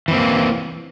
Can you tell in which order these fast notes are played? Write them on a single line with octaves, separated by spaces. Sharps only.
E3 C4 A#3